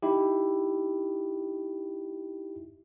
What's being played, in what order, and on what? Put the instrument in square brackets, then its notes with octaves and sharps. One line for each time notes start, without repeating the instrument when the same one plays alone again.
[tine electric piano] D#4 E4 G4